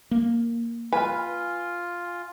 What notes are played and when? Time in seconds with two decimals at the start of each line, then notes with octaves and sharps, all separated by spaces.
0.11 A#3
0.93 F4 B4 G#5 F6